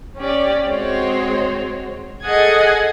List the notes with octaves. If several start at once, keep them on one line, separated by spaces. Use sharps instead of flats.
C#4 G4 D5
G#3 C4 F#4 G#4 C5 C#5
G#4 A4 D#5 F#5 G#5 G#6